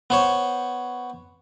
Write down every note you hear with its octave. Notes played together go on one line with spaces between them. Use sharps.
B3 C5 C#5